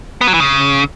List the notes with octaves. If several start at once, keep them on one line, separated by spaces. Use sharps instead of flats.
B3
F#3
E3
C#3